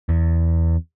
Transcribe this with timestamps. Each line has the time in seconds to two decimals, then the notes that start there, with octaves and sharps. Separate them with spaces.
0.09 E2